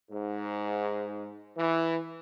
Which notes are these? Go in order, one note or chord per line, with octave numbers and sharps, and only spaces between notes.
G#2
E3